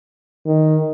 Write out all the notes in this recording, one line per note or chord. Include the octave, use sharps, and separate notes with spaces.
D#3